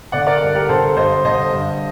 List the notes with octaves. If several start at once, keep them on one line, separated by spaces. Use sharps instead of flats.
D3 D5 F#5
A#4 D5
G2
G4 A#4
D3 A4 C5
G2 C5 D#5
D3 C5 D#5
G2